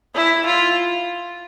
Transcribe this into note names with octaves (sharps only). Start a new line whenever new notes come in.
E4
F4